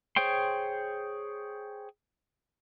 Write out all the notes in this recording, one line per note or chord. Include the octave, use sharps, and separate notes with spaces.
G#4 C5 C#5 G5 C6